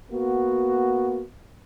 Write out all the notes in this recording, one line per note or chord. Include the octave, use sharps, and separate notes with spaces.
A#3 B3 F#4